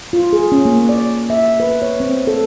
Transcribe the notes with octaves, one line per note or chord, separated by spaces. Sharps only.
F4
G#4
C#4
A#3
D5
E5
B4
C#5
C4
A4